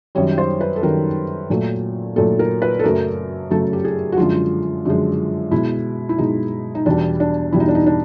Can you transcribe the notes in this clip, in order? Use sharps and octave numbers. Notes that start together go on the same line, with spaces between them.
F#2 D#3 G3 C#5
C5
B4
A4
F#2 D#3 G3 A#4
A#2 F#3 A3
A#2 F#3 A3 A4
A#4
B4
A4
F#2 C#3 F#3 A3 A#4
F#2 C#3 F#3 A3 A4
G4
G#4
F#4
F#2 D3 F3 G#3 F4
F#2 D3 F3 G#3
B2 G#3 E4
E4
B2 G#3 D#4
D#4
E2 B2 G3 D4
D4
E2 B2 G3 E4
D#4
D4
D#4
D4